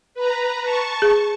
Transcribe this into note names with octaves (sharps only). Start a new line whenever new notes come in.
B4 A#5
A5 C#6
G#4